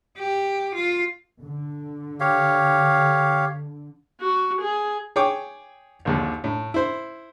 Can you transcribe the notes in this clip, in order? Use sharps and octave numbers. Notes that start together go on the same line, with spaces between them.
G4
F4
D3
G4 C#5 F5
F#4
G#4
G#4 C#5 G5 D6
A#1 D#2 D3
A2
E4 C5